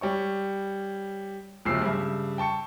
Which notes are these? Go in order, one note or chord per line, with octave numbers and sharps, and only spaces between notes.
G3 C#5 C#6
D1 G1 C#3 F3 E6 C7
G2 C#3 E5
G5 A5 C#6 C#7